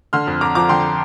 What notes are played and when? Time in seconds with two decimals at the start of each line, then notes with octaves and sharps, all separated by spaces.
0.13 D3 C6 F6
0.27 F2
0.41 F2 A#5 D6
0.55 F3 A#5 D6
0.69 D3 G5 C6